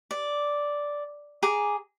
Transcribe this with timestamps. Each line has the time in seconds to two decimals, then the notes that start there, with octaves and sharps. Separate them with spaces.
0.11 D5
1.43 G#4 A#5 D6